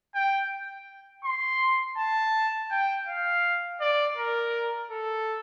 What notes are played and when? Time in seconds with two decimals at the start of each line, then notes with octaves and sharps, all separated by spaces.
0.14 G5
1.24 C6
1.97 A5
2.70 G5
3.07 F5
3.81 D5
4.17 A#4
4.91 A4